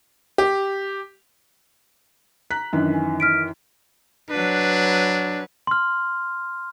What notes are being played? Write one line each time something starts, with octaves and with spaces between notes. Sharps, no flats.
G4
A#5 F#6 B6
F#2 D#3 E3 D4
G#5
F6 B6 D7
F#3 D4 B4
C6 F6